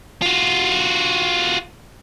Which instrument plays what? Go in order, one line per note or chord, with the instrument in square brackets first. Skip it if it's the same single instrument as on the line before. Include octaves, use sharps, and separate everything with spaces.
[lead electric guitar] F4 F#4